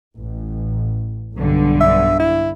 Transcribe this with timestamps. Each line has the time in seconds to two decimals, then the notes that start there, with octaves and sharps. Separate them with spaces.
0.17 A1
1.34 B1 G2 D3
1.80 E5
2.20 E4